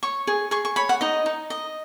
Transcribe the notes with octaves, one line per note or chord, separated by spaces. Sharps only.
C#5 C#6
G#4
G#4 C#6
C#6
C#5 B5
F#5
D#4 D#5
D#4
D#5